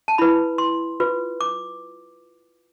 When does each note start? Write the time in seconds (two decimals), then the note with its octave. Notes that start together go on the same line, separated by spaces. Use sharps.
0.08 A5
0.18 E4 B4 B5
0.58 C6
1.00 F4 B4
1.41 D6